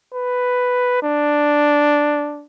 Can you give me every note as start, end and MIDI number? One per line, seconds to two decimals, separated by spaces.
0.13 1.01 71
1.02 2.46 62